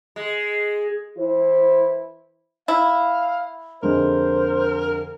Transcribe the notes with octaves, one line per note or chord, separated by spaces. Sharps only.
G#3
E3 E4 C5
E4 F5
F2 D3 G#3 A#4 C5